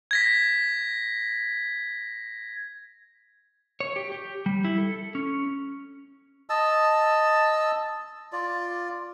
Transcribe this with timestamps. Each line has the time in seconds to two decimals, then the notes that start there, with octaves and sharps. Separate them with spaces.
0.11 G#6 A#6 B6
3.80 C#5
3.96 G4
4.12 G4
4.46 G3
4.65 E4
4.78 A4
5.15 C#4
6.49 D#5 A5 E6
8.32 F4 D5